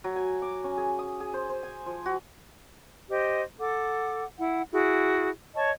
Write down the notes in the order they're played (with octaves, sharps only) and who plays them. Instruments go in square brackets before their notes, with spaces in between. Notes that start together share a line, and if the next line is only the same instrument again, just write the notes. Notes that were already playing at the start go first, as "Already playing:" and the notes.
[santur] F#3
G#5
D6
C#4
G#4
D#6
G#4
C5
C5
G#5
F3
F#4
[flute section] G4 C5 D#5
A4 F#5 D6
E4 F#5
E4 F#4 G#4
C#5 D#5 A5 C#6